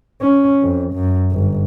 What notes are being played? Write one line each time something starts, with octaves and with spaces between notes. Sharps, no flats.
C#4
F2
F#2
G1